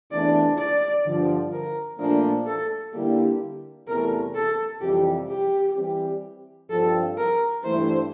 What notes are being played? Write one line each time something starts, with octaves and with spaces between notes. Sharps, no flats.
E2 C3 E3 A3 D4 D5
D5
G2 D3 F3
A#4
A#2 F3 A3 D4 A#4
A4
D3 G3 A#3 E4 G4
E2 C3 E3 A3 A#4
A4
F2 C3 E3 G3 G4
G4
E3 G3 C4 G4
G2 F3 C4 A4
A#4
G2 E3 A3 E4 C5